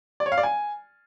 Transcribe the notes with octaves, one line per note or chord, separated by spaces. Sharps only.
D5
C#5
F5
D5
G#5